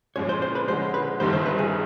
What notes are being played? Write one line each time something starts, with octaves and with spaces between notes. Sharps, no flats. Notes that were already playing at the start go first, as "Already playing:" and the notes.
A#2 F3 G#3 C#4 C#5
C5
C5
B4
D3 F3 G#3 C#4 C5
B4
G1 G2 D#3 G3 C5
C5
B4
G#4